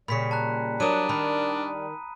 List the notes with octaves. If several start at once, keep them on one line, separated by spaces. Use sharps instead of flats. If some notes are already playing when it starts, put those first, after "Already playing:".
A#2 C#3 G3 B5 B6 C#7
A5 A#5 F#6
F#3 A#3 D4 A#5 D#6 D#7
D#3 B5